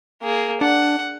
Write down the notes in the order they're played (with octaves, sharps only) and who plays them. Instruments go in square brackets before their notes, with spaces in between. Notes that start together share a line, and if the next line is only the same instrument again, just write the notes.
[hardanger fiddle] A#3 G#4
[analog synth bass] D4 [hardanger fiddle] F#5